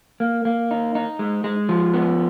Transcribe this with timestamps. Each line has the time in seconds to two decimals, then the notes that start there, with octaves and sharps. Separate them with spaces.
0.20 A#3
0.45 A#3
0.71 D#4
0.95 D#4
1.19 G#3
1.44 G#3
1.69 F3
1.94 B3